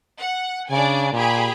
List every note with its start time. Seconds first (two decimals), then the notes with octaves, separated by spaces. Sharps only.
0.19 F#5
0.70 C#3 D4 D5 G#5
1.13 A#2 G4 G#4 B5